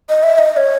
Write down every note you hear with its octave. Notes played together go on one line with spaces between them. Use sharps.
D#5
E5
D#5
D#5
C#5